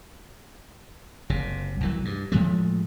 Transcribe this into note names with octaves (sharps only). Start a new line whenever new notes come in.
F#1 C3
C2 E3 F#3
G2
A2 F3 G#3 A3